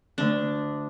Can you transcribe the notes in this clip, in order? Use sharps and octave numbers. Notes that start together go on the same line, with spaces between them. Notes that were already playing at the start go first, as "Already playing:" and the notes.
D2 D3 A3 D4